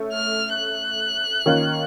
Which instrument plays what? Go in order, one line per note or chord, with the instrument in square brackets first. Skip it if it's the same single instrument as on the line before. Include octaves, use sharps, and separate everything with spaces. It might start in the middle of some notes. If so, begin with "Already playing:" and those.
Already playing: [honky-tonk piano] A3 C#4
[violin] F6
F#6
[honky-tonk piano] D#3 A#3 C#4 F4